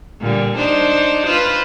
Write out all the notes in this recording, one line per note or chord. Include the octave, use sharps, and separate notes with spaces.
A#2 D3 G3
D4 D#4 C5
F4 B4 C5